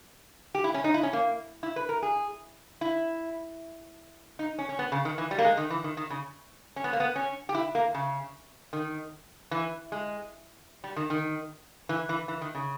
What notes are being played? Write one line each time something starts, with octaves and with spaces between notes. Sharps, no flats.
G4
E4
C#4
D#4
E4
C#4
A#3
E4
B4
A#4
G#4
E4
D#4
C#4
C#4
B3
C#3
D#3
E3
G3
A#3
G#3
D#3
E3
D#3
D#3
C#3
C#4
B3
A#3
B3
C#4
G4
E4
A#3
C#3
D#3
E3
G#3
G3
D#3
D#3
E3
E3
E3
D#3
C#3